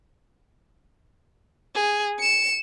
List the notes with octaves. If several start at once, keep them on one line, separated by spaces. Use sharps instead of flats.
G#4
C#7 E7